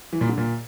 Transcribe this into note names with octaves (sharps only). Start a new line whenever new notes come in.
E3
A#2
D3
A#2